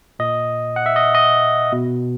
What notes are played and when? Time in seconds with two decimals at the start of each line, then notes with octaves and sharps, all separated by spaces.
0.19 A#2 D#5
0.76 F#5
0.86 E5
0.96 D#5
1.15 D#5
1.72 B2